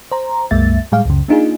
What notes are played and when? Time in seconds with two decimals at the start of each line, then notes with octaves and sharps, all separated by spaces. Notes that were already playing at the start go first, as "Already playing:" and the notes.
0.12 C5 A#5
0.51 C2 F#2 G#3 A#3 E5 A6
0.92 A2 G3 G#3 G#4 F5
1.05 C#2 F#2 C#3
1.28 A#3 D4 D#4 F4 G#4